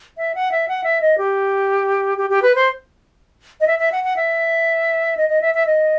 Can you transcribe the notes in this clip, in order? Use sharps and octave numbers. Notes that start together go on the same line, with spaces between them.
E5
F#5
E5
F#5
E5
D#5
G4
G4
G4
B4
C5
D#5
E5
E5
F#5
F#5
E5
D#5
D#5
E5
E5
D#5